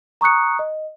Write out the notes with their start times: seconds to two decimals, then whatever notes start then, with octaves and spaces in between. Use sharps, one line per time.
0.21 A#5 C#6 D#6 F#6 C#7
0.59 D#5